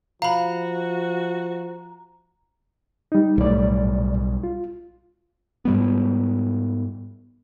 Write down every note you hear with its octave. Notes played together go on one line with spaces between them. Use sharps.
F3 F#4 F5 A#5 B5
G3 D#4
B1 A2 G3 D5
F4
G#2 G3 B3